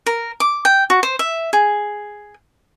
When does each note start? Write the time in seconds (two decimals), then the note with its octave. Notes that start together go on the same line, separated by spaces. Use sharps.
0.06 A#4
0.40 D6
0.65 G5
0.90 F#4
1.03 C5
1.19 E5
1.53 G#4